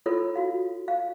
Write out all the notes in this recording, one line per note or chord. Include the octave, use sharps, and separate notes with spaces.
E4 F4 A4 B4 C#5
F#4 F5
F5